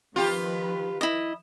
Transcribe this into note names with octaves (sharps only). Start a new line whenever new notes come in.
D#3 F3 F4 G4 B4
E4 D#5